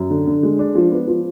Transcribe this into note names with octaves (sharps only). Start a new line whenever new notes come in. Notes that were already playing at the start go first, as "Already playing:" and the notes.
Already playing: F#2
D3
D3
G#3
D4
F3
B3
F3